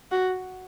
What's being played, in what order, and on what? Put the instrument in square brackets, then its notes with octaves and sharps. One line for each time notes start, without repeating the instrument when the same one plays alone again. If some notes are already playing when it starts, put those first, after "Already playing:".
[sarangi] F#4